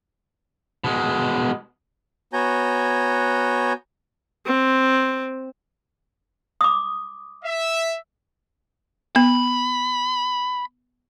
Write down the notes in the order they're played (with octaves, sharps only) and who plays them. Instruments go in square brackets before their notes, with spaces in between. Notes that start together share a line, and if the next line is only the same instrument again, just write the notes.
[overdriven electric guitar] B2 G#3
[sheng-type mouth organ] B3 F#4 C#5 G#5 A#5 G6
[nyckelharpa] C4
[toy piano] D6 D#6
[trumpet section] E5
[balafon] B3 [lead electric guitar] B5